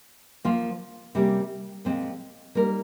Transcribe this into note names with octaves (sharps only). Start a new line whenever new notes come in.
F3 A#3 F4
C3 G3 A#3 C#4
A#2 F3 G#3 C4
G3 A#3 D#4 A#4